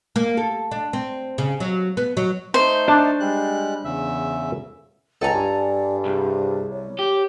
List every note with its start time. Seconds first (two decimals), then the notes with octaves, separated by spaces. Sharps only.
0.16 A#3
0.37 A4
0.71 D4
0.93 C4
1.38 C#3
1.60 F#3
1.97 B3
2.17 F#3
2.54 A3 D#4 C5
2.88 D4 A5
3.20 G3 G#3 F#6
3.85 E2 C#3 E5
5.21 C#2 A4 G#5 A#5
5.34 G2 D5
6.05 C2 G#4
6.71 C#5
6.99 G4